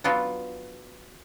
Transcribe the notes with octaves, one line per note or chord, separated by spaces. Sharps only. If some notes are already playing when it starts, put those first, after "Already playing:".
F#3 B3 D4 F4